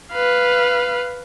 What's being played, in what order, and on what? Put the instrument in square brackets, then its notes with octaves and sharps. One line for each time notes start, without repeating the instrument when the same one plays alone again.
[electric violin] B4 F5